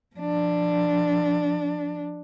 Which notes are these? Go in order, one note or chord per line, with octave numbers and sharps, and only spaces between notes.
F3 D4